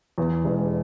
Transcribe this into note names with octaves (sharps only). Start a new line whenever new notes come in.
E2
E1